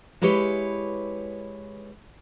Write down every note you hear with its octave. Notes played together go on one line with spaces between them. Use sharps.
G#3 E4 G4 B4 C#5